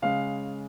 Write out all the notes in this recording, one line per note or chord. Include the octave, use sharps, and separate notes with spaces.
C#3 G#3 F5